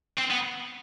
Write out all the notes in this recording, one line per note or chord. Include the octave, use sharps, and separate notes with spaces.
C4
B3